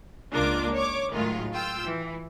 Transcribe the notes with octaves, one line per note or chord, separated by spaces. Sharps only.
C#2 A#3 D4 F4 D6
C#5 D6
A2 D#3 F#3 G#3 F4
F4 G5 E6
E3